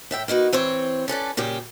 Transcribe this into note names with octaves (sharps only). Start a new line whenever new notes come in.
A2 E5 G5
A#3 D#4 F#4 B4
E3 C4 C5 C#5
C#4 A4 B4 D5
A#2 C#3 G3 G4